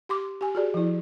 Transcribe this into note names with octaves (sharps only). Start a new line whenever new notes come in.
G4 C6 D6
G4 G#5
F#4 G#4 D5
F3 E4